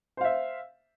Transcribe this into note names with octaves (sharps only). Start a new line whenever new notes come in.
C5 E5 F5